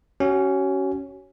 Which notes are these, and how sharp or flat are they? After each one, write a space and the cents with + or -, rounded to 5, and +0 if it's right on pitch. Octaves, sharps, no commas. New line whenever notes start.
C#4 +0 F#4 +35